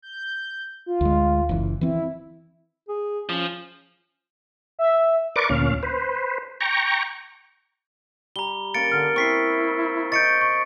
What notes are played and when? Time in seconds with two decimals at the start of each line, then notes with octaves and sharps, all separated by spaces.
0.02 G6
0.86 F4
1.01 D2 G#3
1.49 F#1 E3
1.81 E3 C4 E4
2.89 G#4
3.29 F3 C#4
4.79 E5
5.36 A#4 B4 D5 C#6 D6
5.50 D2 A#2 C#4 F5
5.83 B4 C5
6.61 G5 A#5 C#6
8.36 G3 A#5 G7
8.74 A#3 C#4 A6 C#7 D7
8.92 D3 F6
9.16 C4 E4 C#6 B6 C7
10.12 D#5 C#6 G6 A6 C#7 D7
10.41 C#6